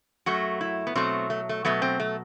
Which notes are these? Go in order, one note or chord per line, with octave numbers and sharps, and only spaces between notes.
F#2 F#3 A3 F#4
E4
B3
B2 F#3 A3 C4
A3
A3
B2 F#3 A3 B3
C4
A3